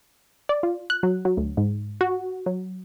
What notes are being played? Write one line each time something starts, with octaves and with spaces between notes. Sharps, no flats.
D5
F4
F#6
F#3
F#3
D2
G#2
F#4
F#3